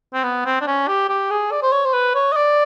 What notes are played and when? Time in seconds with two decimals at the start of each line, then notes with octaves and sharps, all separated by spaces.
0.14 C4
0.24 B3
0.45 C4
0.61 D4
0.67 C#4
0.88 G4
1.09 G4
1.31 G#4
1.51 D5
1.62 C5
1.72 C#5
1.85 C5
1.93 B4
2.15 C#5
2.32 D#5
2.36 D5